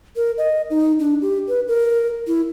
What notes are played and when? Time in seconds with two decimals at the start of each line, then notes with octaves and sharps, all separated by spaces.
0.16 A#4
0.38 D#5
0.70 D#4
0.99 D4
1.22 G4
1.48 B4
1.68 A#4
2.27 E4